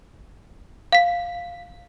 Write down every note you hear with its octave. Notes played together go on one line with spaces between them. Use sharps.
F5 B6